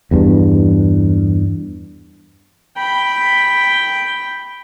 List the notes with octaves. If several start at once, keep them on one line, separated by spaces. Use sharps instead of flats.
E2 G2
G5 B5